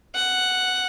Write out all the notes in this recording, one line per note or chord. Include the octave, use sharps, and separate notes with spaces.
F#5